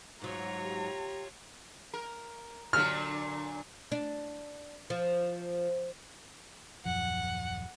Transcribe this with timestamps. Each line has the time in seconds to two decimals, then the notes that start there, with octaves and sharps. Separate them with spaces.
0.22 G#2 F#3 F4 C#5 A#5
0.62 G4
1.94 A#4
2.73 A#2 D3 F#3 F6
3.92 D4
4.90 F3
6.85 D#1 F#2 F3 F#5